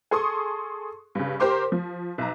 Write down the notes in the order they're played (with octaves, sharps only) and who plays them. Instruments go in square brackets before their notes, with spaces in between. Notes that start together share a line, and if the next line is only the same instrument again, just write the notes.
[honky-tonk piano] G#4 A4 C6 C#6 D#6
G2 C#3
G4 A#4 C5 C6 D6
F3
B1 A#5